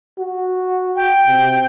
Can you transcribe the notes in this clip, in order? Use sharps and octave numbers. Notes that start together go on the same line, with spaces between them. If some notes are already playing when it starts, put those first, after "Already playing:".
F#4
G5
C3